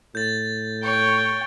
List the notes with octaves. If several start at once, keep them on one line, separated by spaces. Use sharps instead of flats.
A2 G6 A6
C#5 G5